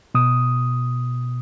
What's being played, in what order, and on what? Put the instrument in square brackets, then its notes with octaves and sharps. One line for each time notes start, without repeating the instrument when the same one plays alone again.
[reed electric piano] B2 D#6